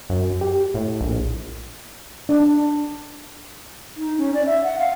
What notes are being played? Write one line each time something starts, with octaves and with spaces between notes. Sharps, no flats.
F#2
G4
A2
A#1
D4
D#4
C#4
D5
E5
F#5
F5